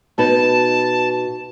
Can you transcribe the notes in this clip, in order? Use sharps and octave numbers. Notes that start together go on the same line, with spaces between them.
B2 D#4 B4 A5